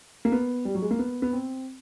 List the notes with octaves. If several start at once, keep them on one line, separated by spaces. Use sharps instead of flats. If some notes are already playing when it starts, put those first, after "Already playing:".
A#3
B3
G3
F#3
G#3
A#3
B3
B3
C4